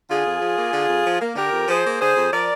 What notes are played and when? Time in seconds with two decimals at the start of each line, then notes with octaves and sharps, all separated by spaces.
0.09 D3 F4 G#4
0.25 F2
0.41 F3
0.57 A#3
0.73 D3
0.89 F2
1.04 F3
1.21 A#3
1.36 D3 G4 A#4
1.52 F2
1.68 F3 G#4 C5
1.84 A#3
2.00 D3 G#4 C5
2.16 F2
2.32 F3 A#4 D5